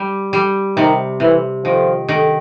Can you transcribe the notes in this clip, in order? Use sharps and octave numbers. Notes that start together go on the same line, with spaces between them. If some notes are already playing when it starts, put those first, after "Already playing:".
Already playing: G3
G3
C3 D#3
C3 E3
D#3 F3
D#3